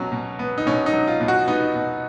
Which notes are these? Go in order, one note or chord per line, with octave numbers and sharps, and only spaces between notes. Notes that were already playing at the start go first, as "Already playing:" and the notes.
Already playing: B2 F#3 C#4
B2
B3
D#4
B2 C#4
D#4
F#3
F4
B2
F#4
B3 D#4
B2